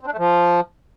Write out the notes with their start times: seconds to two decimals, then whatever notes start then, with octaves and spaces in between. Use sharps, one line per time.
0.01 C4
0.06 D4
0.12 A3
0.18 F3